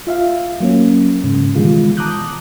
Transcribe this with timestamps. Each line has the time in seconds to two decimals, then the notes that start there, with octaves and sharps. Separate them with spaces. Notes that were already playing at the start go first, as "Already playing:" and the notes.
0.07 F4 E5 F5
0.60 F#3 A#3 C#4
1.24 G#2 C#3
1.55 B2 D#3 E3 G3 G#3 F4
1.97 A5 A#5 D6 D#6 F#6 G6